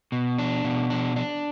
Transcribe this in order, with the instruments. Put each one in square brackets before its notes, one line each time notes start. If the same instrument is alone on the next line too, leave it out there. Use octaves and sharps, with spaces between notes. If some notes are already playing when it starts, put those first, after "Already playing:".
[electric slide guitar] B2
D4
B2
D4
D4